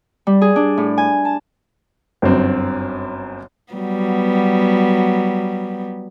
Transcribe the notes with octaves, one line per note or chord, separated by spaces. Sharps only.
G3
G#4
D4
A2
G#5
A5
G1 F#2 C4
F#3 G3 B3